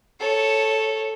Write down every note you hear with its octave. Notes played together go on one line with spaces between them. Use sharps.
A4 C#5